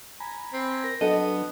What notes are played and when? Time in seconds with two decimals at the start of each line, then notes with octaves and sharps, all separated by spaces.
0.20 G#5 A#5 B5
0.53 C4
0.84 A#4 A#6
1.01 F#3 B3 D4 A4 D#5